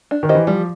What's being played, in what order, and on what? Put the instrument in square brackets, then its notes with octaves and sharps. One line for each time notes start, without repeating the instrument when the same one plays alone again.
[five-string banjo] D4
[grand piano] D#3
[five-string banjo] G4 C5 D#5
[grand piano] E3
[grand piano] F3 [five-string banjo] G3